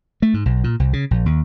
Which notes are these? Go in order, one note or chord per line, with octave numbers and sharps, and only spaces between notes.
A3
G#2
B1
A#2
C2
C#3
A#1
D#2